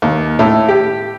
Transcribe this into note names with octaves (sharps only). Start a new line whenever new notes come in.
D#2
A2
G4